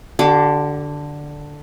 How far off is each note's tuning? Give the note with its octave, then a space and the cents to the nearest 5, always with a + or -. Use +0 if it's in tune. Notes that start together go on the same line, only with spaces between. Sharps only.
D3 +0 G4 -45 D6 +0